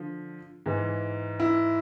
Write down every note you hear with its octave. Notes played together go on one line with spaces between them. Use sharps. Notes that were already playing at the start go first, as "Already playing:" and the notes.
Already playing: D3 F3
G#2 E3
E4